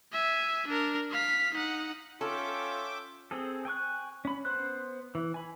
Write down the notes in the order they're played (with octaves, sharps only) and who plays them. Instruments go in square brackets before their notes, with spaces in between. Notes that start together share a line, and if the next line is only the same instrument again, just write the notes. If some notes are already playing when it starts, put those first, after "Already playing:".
[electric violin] E5 G#5
D4 A#4
F5 B6
D#4 F#5
[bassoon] C#4 [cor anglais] F4 [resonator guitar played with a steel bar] A4 [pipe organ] E5 G5 D6
[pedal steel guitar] C4 G#4 A4
G5 G#5 C#6 F#6
C#4 B5
B3 C5 C6 F#6
E3
G#5 B5